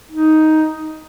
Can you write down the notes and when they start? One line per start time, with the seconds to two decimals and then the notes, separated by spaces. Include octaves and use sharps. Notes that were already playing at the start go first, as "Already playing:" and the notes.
0.11 D#4